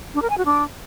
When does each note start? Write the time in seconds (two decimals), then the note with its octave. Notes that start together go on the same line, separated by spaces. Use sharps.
0.14 D4
0.22 A#4
0.30 G#5
0.38 F#4
0.45 D4